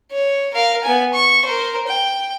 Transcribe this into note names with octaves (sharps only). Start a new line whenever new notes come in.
C#5
A#4 F5
B3 G#5
C#6
A#4 C5
G5